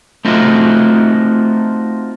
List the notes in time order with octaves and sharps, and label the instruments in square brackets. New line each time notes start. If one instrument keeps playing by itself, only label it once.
[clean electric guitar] A3 C4 D#4 F4 F#4